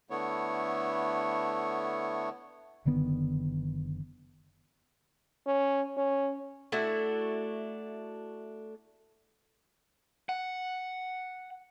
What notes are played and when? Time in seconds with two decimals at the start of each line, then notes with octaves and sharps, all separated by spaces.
0.10 D3 A3 B3 E4 C#5
2.85 F#1 D3 D#3 B3
5.46 C#4
5.97 C#4
6.72 A3 D4 E4 F#4
10.29 F#5